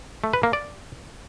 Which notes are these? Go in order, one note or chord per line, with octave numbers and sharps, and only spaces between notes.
A3
B4
A#3
D5